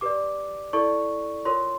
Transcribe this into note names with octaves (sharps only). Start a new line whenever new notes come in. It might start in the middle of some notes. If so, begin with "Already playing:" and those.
G4 B4 D5 D6
E4 A4 D5 C#6
F4 A#4 C#5 C6